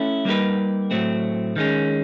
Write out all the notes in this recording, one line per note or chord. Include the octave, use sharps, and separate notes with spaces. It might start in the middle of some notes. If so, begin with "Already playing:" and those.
Already playing: A3 C#4 E4 A4
G3 A#3 D#4 G4 B4
A2 F#3 A3 C4
D#3 G#3 C#4